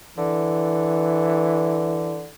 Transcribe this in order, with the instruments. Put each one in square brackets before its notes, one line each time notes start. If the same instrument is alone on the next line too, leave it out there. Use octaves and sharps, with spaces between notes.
[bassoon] D3 [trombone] E3